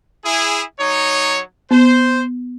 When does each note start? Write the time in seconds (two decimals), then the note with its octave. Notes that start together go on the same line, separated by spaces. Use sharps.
0.25 E4 G#4
0.79 F#3 D#4 C#5
1.71 B3 C5